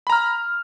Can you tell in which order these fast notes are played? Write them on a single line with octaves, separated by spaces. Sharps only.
B5 A#5 F6